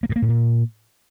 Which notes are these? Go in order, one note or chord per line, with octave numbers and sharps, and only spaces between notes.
A#3
G2
A#3
A2
A#2